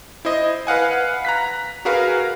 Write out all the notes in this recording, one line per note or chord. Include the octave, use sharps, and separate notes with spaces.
E4 C5 D#5
B4 F5 F#5 G#5
A#5 F#6 B6
F#4 G#4 A#4 B4 F5